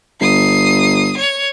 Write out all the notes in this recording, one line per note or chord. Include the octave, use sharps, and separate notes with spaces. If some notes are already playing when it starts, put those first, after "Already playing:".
G1 D#6 C7
C#5